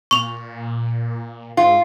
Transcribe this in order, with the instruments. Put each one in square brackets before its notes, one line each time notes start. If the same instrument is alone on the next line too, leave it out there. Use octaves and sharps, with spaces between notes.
[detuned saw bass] A#2 [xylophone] C#6 F7
[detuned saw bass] G#2 [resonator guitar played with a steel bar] F4